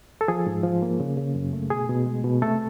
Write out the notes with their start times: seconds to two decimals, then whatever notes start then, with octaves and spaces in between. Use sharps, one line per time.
0.21 A4
0.28 F3 G#4
0.46 G#2
0.63 F3
0.82 A#3
1.00 C#3
1.17 C#3
1.35 F#2
1.53 A3
1.70 B2 G#4
1.89 B2
2.06 G#3
2.24 B2
2.42 C3 A3 A4